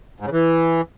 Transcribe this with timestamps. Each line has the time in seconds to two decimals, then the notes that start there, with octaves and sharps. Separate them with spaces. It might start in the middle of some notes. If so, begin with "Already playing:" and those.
0.20 G#2
0.26 C#3
0.32 E3